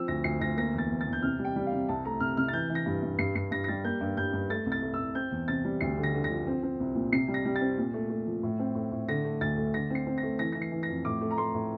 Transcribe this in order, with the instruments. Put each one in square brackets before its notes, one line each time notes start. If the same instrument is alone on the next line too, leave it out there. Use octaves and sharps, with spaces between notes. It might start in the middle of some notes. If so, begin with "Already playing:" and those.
Already playing: [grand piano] F3 C4 E6
D2 A#6
D2 C7
D2 A#6
A#3 A#6
E2 A6
E2
A6
E2
G6
C3 F6
G3
G5
G3
F5
C3
C2 A5
A3 A#5
C2 F6
C3 F6
A6
E3 G6
E3
A#6
G2
G2
G2 C7
G2 C7
G2 A#6
A#6
G3 A6
A#3 G6
G2
G2 G6
G2
A3 A6
C2
A6
A3
E6
C2
C4 G6
E2
C3 A6
G3
D2 C7
D3
A#6
D3
A#6
F3
C4
C4
C2
A#2
C3 C7
G3
A#6
G3
A6
C4
A#2
A3
A3
F3
A2
C4
A2
A2
D3 A#6
A3
D2 A6
A3
D3 A#6
C4 C7
C4
A#6
A3
E3 A#6
E3 A#6
C7
E3
A#6
F2
A2 D6
A3
A#5
A3 C6
A2